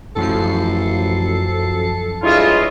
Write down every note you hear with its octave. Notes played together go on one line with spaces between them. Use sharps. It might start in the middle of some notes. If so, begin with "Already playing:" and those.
A1 F#2 F3 A4 C7
G2 G#3 E4 F4 C#5 D#5 E5